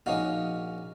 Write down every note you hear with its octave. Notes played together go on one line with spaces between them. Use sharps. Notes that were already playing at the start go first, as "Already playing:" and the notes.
A#1 C#4 D#4 F#4 D#5 F5